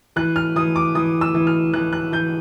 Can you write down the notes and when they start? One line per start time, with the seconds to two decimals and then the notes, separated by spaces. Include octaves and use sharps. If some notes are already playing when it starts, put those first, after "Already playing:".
0.16 E3 F#6
0.36 F6
0.56 E3 D#6
0.76 D6
0.95 E3 D#6
1.21 E6
1.34 E3
1.47 F6
1.74 E3 F#6
1.93 F#6
2.12 E3 G6